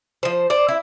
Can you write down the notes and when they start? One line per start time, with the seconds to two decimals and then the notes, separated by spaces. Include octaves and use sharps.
0.23 F3 C5
0.50 C5 D5
0.68 E4